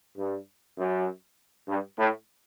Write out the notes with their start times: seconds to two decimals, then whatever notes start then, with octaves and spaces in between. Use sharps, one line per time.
0.17 G2
0.78 F#2
1.68 G2
1.98 A2